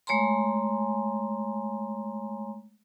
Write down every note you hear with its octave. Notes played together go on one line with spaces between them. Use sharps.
G#3 A3 C#5 G#5 A#5 C6